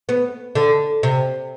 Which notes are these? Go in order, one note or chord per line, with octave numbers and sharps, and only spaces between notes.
B3
D3
C3